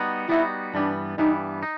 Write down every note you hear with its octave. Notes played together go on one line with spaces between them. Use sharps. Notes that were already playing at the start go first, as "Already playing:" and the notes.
Already playing: G3 B3 D#4 F#4
G3 B3 D#4 E4 F#4
G2 E3 G3 B3 D4
G2 E3 G3 B3 D#4
D#4